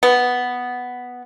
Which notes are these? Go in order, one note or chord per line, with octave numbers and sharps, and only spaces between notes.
B3